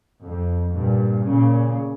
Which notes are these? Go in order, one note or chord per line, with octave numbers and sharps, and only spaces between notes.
F2
G2 A#2
A#2 C#3